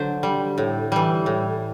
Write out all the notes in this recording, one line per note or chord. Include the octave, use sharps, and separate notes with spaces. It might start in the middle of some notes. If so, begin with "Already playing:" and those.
Already playing: D3 F#3 C5
G3
A2
E3 G3
A2